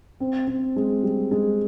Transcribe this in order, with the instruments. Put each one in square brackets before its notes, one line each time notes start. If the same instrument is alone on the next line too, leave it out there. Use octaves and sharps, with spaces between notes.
[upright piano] C4
C4
G#3
G3
G#3